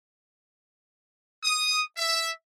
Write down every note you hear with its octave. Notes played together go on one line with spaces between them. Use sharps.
D#6
E5